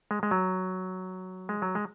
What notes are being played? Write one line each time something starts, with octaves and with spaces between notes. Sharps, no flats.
G#3
G#3
F#3
G#3
F#3
G#3